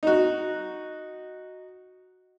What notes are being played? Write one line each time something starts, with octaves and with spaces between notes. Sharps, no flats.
D#4 F#4